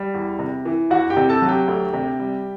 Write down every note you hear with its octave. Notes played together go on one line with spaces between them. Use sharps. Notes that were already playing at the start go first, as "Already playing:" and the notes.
Already playing: G3
E2
C3
E3
E2 F#4 F#5
G4 G5
C3
A4 A5
F#3
G4 G5
D2
C3
G3